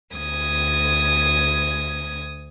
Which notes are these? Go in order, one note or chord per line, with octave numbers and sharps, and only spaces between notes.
D2 D#6 G#6